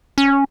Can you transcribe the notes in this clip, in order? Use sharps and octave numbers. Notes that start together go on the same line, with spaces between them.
C#4